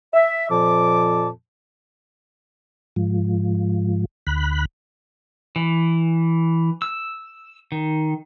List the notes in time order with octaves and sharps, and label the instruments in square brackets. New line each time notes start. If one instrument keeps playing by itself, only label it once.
[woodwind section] E5
F2 A#2 F3 A5 D6
[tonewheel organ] G#2 F3
D2 B5 F#6
[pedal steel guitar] E3
E6
D#3